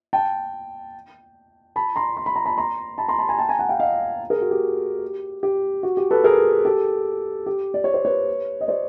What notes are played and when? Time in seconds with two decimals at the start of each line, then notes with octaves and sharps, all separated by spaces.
0.13 G5 A5
1.76 A5 B5
1.96 A#5 C6
2.17 C6
2.26 B5
2.36 A#5
2.46 A5 B5
2.57 A#5 C6
2.98 A5 B5
3.08 A#5 C6
3.18 A5 B5
3.29 G#5 A#5
3.39 G5 A5
3.49 G#5 A#5
3.59 F#5 G#5
3.69 F5 G5
3.80 D#5 F5
4.30 G#4 A#4
4.41 F#4
4.51 G4
5.43 G4
5.83 F#4
5.97 G4
6.11 A4 B4
6.24 G#4 A#4
6.65 G4 A4
7.46 G4
7.74 D5
7.84 C#5
7.94 C5
8.05 B4 C#5
8.61 D#5
8.68 C5 D5